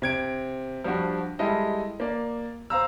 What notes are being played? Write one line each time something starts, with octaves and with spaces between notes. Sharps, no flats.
C3 G#6 D7
F3 G3 D4 F#4
G3 G#3 E4 A4 D#5
A#3 D5
C5 F5 A#5 E6